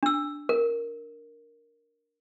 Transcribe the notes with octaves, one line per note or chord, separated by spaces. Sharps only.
D4 E6
A#4